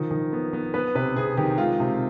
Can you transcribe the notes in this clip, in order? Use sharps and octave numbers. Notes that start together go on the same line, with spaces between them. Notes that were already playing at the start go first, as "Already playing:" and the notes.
Already playing: D#3 F3
D#3
B3
B3
B3 B4
C3 B4
C3 G#4
D#3 G4
G#3 F4
C3